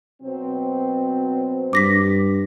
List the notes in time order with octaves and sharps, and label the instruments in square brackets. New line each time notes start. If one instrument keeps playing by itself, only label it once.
[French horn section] B2 F#3 C4
[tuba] G2 [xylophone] D6 A#6 B6